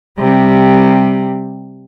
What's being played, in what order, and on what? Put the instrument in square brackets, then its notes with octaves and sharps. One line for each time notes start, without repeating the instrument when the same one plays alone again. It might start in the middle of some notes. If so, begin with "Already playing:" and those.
[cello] C3 G3